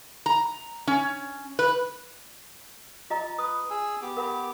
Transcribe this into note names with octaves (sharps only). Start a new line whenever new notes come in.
A#5
C#4
B4
F4 D#5 A#5
B4 D#6
G#4 G#5 E6
B3 G4 D6
A#4 F#5 B5